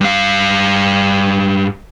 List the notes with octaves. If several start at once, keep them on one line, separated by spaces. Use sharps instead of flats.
G2 F5